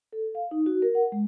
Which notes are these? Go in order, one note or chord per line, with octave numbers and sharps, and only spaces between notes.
A4
F5
D#4
F#4
A#4
F#5
G#3